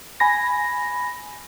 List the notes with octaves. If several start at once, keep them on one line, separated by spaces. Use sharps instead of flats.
G#5 B5 A#6